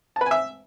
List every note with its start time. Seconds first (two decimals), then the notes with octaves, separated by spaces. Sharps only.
0.16 A5
0.21 B4
0.26 G#5
0.31 E5